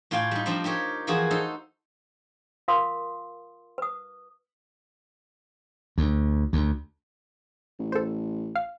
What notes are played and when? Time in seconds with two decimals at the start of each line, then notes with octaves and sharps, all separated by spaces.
0.11 A2 F4 D5 F5 G5 G#5
0.31 G3 D#4
0.46 F3 C4 D4 D#5 F5
0.64 D#4 G4 A#4 C#5
1.07 E3 F3 A#3 F#4 G#4 C5
1.31 D#4 A4 C5
2.68 F4 A#4 F5 C6 D#6
3.78 B4 D#6
5.98 D2
6.53 D2
7.79 A1
7.92 A4 C5
8.56 F5